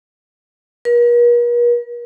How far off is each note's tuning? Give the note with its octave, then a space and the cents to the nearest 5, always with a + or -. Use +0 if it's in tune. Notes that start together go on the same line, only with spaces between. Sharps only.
A#4 +45